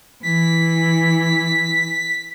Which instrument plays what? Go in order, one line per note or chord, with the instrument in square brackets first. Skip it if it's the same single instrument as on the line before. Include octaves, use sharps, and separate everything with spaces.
[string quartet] E3 [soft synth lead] B6